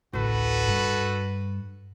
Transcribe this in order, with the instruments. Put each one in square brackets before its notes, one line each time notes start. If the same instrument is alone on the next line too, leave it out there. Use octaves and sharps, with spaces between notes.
[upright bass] A1 D2 [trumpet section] F#4 A4 B4
[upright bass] G2